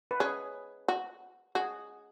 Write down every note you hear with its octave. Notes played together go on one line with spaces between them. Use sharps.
B4
C#4 G#4
F#4
F#4 G#4